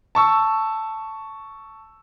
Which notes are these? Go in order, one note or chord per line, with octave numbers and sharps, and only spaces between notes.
A5 C#6 E6